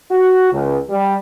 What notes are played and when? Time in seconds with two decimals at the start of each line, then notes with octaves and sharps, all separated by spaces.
0.11 F#4
0.52 C#2
0.89 G3